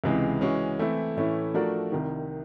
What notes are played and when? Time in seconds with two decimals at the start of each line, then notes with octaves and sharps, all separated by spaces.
0.04 C#2 C3 E3 G#3
0.41 E3 G#3 C#4 F#4
0.79 E3 A3 C4 E4
1.16 A2 E3 A3 C#4 E4
1.54 F3 A3 D4 F#4 A#4
1.92 C2 C3 D#3